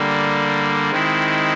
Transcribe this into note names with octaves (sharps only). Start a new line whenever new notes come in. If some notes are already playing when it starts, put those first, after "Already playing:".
Already playing: D3 G3 A#3
D#3 G#3 C4 E4